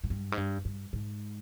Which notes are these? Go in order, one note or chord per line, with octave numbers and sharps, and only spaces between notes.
G#2
G2
G#2
G2
G2
G#2